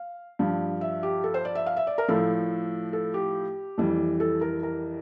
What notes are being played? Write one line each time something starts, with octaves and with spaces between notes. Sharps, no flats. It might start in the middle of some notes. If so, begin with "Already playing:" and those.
Already playing: F5
G2 F3
E5
G4
A4
C5
D5
E5
F5
E5
D5
A#4
A2 F3 A4
A4
G4
F2 E3 G3
A4
A#4
A#4